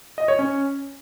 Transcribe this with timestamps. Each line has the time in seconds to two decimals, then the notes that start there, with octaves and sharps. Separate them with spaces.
0.18 D#5
0.28 C#5
0.39 C#4